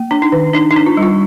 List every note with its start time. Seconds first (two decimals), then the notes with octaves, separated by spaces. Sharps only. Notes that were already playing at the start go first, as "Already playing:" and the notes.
Already playing: A#3
0.11 D4
0.22 D#4
0.32 D#3
0.54 D4 D#4
0.71 D#4
0.76 D4
0.86 F4
0.97 G3
1.03 F4